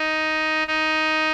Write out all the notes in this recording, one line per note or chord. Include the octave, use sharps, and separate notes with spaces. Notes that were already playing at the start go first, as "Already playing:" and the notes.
Already playing: D#4
D#4